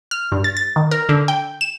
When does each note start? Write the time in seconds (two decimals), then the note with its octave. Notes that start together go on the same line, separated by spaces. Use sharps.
0.11 F6
0.32 G2
0.44 A6
0.57 A6
0.76 D#3
0.91 A#4
1.09 D3
1.28 G5
1.61 E7